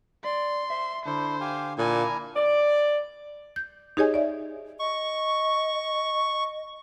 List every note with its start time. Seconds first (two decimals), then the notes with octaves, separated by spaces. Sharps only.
0.24 D5 C6
0.70 C5 E5
1.06 D3 D4 E4 C5
1.41 G4 F5 G#5
1.79 A#2 D4 E4 G#5 A#5
2.36 D5
3.56 G6
3.97 D#4 G4 G#4 C#5 D#5 G#5
4.14 D5 E5
4.79 D#5 C#6